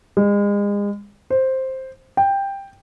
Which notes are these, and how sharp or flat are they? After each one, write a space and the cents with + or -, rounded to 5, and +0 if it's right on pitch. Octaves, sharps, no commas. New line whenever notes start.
G#3 -35
C5 +5
G5 +10